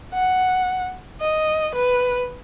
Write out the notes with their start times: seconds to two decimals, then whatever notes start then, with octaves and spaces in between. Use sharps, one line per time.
0.14 F#5
1.20 D#5
1.74 B4